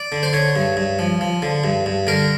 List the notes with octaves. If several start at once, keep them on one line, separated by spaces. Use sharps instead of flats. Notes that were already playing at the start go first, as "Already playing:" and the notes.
Already playing: D5
D3
C5
D3 C#5
G2
G2
F3
F3
D3
G2
G2
D3 A#4